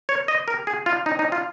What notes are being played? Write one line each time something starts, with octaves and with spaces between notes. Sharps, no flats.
C#5
D#5
A#4
G#4
F4
D#4
D#4
F4